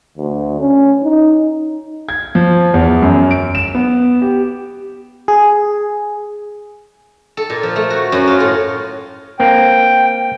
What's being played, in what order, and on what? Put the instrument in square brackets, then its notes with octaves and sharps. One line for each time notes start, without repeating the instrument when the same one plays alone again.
[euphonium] D2
C#4
D#4
[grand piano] G#6
F3
E2
F#2
D7
E7
B3
G4
[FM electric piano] G#4
[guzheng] A4
A#2
F3
A3
F#4
F#2
F4
A2
[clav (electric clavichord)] A#3 C4 [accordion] G5